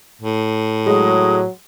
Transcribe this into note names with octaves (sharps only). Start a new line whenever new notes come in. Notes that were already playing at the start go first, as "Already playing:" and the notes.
A2
F#3 G#3 D#6